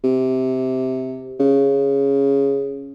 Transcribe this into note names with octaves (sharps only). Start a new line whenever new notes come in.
C3
C#3